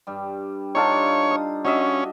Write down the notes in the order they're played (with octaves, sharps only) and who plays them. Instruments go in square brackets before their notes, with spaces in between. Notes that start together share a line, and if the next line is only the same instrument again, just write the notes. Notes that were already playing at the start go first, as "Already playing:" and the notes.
[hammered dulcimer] G2 G3
[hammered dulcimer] D4 F4 G4 [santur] D#4 A4 F5 [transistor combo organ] C#5
[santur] D#6
[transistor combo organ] C#4 [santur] F#4 D#5 E5